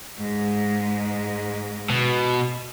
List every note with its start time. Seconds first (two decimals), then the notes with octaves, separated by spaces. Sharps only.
0.18 G#2 G#3
1.90 B2